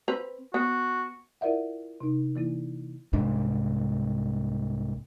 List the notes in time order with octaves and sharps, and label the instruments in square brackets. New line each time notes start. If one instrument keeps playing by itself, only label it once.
[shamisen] C4 B4 A#5
[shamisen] B3 [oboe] F#4
[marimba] E4 F4 A#4 D5 E5 F#5
C3 D#4
E3 A#3 E4
[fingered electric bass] C2 G#2 D4